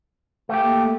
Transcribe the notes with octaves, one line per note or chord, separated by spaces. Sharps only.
A3 G4
A#3